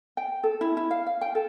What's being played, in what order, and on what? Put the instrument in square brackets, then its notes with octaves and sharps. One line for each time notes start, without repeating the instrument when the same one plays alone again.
[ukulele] G5
A4
E4
E4
F5
F5
G5
A4